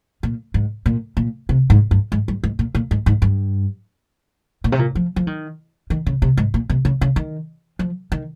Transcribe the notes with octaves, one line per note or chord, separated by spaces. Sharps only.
A#2
G#2
A#2
A#2
C3
G#2
G2
G#2
G2
G#2
A#2
A#2
G#2
G#2
G2
A#2
C3
A#2
F3
F3
D#3
D#3
C#3
C3
G#2
A#2
C3
C#3
C#3
D#3
F3
D#3